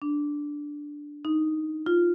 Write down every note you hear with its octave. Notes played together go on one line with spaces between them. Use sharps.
D4
D#4
F4